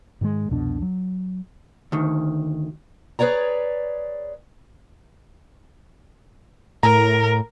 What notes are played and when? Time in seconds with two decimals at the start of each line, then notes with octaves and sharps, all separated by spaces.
0.21 G#2 D#3 F3 G#3
0.49 C2 F2 B2 D4
0.82 F#3
1.92 D2 D#3
3.19 G#4 B4 C#5 D5 A#5
6.83 A2 A#4 A#5